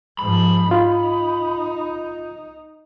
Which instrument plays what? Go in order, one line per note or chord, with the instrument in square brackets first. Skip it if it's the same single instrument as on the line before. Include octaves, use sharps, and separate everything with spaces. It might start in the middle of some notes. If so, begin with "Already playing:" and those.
[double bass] G#2 F3 [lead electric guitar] B5
[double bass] D#4 [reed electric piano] F4